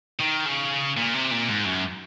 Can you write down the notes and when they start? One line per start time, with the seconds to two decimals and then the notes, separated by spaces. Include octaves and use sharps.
0.19 D#3
0.45 C#3
0.97 A#2
1.14 C3
1.31 A#2
1.49 G#2
1.65 F#2